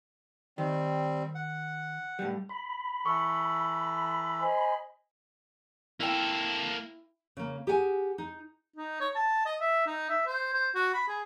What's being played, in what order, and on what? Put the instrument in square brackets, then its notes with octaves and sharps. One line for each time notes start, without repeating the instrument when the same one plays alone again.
[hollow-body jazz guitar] D#3 [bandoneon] G3 C4
[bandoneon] F#5
[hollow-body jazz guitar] A2 G3
[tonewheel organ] B5
[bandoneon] E3 A4 [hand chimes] C#6
[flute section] C5 D#5 G#5
[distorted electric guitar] A#3 A4 [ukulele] E4 G5
[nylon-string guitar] C#3 A#3
G4 G#4 F#5 G#5
D#4
[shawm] D#4
C#5
A5
D#5
E5
D#4
E5
C5
C5
F#4
B5
G#4